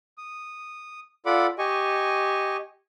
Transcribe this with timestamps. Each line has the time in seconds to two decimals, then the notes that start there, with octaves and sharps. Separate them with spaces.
0.18 D#6
1.26 F4 A4 D5 F#5 B5 D6
1.59 G4 D#5 G#5 C#6